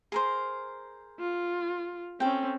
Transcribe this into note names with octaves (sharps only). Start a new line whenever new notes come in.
G#4 A#4 C5
F4
C4 C#4 A4 G5